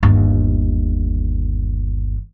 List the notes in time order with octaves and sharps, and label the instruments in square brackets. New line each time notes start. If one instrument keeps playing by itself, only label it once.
[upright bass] G1 D#2